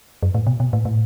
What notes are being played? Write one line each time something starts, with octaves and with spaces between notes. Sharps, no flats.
F#2
A2
B2
B2
A2
A2